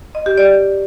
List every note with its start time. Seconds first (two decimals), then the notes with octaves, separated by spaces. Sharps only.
0.15 D#5
0.26 G4
0.38 D5